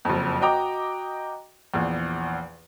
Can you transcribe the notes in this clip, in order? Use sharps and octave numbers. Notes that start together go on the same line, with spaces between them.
F#1 F2
F#4 D#5 G5 A#5 D6
A#1 E2